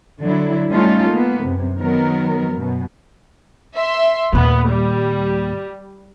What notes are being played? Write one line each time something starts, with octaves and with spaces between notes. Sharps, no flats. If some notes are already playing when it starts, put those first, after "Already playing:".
D3 F#3 E4
G3 A3 C#4 D#4 F4 A4
G#3 A#3 B3
F#2 C3
D#3 F#3 B3 A#4
F#2 B2
E5 C6
D#2 A#2 B3
G3